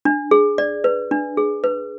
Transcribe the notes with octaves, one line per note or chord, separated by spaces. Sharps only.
D4
G#4
D5
B4
D4
G#4
B4